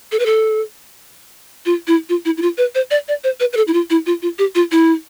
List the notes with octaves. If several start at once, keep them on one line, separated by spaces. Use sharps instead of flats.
A4
B4
A4
F4
E4
F4
E4
E4
F4
B4
C5
D5
D5
C5
B4
B4
A4
E4
F4
E4
F4
F4
G4
F4
E4